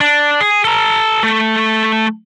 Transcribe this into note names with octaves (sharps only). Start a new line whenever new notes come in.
D4
G#4
A4 A#5
A3